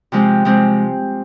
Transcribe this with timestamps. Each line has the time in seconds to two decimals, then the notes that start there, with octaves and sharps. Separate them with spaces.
0.12 C3 F3 G#3 C4
0.45 C3 F3 G#3 C4